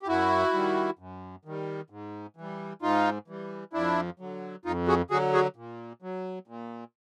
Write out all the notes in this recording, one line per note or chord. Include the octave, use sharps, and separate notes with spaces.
G4
F#2 E4 F#4
D#3 G3
F#2
D#3 G3
G#2
E3 G3
G#2 D#4 F4
E3 G3
F2 D4 E4
D3 F#3
F2 D#4 F4
F#4 G#4
D3 F#3 F#4 G#4
F#4 G#4
A#2
F#3
A#2